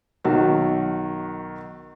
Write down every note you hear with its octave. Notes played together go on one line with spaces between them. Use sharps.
B1 D#3 F#4